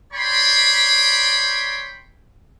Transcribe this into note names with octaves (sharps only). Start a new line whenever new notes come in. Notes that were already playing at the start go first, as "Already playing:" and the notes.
C#5 D5 G5 B5 C6